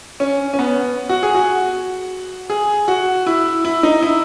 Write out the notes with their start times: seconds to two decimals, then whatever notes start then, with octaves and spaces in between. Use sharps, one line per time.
0.20 C#4
0.54 C#4
0.59 B3
1.09 F#4
1.23 G#4
1.35 F#4
2.50 G#4
2.88 F#4
3.26 E4
3.65 E4
3.83 D#4
4.02 E4